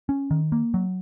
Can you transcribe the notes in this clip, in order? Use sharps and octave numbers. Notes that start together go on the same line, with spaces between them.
C#4
D#3
A#3
F#3